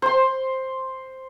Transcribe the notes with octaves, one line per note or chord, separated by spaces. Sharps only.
C5 C6